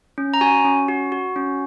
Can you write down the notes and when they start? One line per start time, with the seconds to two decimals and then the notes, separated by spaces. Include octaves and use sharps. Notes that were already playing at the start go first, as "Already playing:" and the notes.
0.18 C#4
0.34 A#5
0.41 F#4 G#5
0.65 C#4
0.88 F#4
1.12 F#4
1.36 C#4